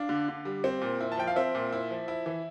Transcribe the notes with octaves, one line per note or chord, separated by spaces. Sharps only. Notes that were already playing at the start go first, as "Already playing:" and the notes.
Already playing: D4 F5
D3
D3
G3
C4
A#2
E4
A5
F3 G5
F5
C4 E5
A#2
E4
F3
E4
E3